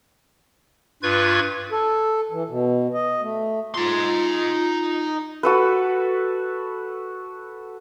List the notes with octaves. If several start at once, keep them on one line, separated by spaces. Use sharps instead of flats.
G2 F4 B4 C#6 G#6
A4
E3
B2
D#5
A3
D#4 F4 C6
F#4 A4 B4